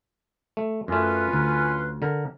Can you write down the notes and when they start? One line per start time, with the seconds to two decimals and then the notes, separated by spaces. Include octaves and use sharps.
0.57 A3
0.88 F#2 A3 C#4 F4 B4
1.33 D2
2.02 D3 A#4